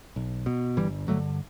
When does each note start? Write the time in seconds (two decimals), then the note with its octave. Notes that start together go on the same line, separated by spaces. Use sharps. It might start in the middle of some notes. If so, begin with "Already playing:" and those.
0.16 B1
0.46 B2
0.77 G1 E3 G3
1.08 G2 D3 F#3 A3